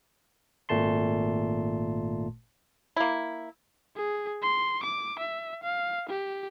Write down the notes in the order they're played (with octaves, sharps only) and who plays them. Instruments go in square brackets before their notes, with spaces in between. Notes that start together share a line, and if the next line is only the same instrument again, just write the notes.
[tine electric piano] G#1 A#2 A3 A5 C6
[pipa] A#3 E4
[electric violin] G#4
C6
D6
E5
F5
G4